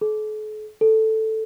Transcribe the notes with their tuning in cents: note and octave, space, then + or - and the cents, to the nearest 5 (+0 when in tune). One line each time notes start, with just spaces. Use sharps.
A4 -45
A4 +0